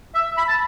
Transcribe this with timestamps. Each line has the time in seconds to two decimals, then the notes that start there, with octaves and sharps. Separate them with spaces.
0.15 E5
0.38 B5
0.48 A5